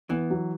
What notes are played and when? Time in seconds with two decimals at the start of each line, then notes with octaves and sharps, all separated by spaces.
0.10 E3 B3
0.30 F#3